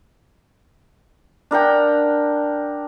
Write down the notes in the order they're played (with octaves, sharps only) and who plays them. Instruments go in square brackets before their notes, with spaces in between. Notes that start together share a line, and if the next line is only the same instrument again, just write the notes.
[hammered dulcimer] D4 A#4 F#5 G5